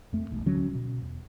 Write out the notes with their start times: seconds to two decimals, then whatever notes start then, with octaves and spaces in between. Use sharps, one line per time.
0.13 F2 A3
0.31 E1 B1
0.46 D1 D3 F#3 C#4
0.75 B2
1.02 E2